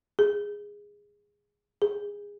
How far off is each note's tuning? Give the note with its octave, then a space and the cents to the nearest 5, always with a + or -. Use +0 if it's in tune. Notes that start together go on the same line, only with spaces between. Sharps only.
G#4 -10
G#4 -20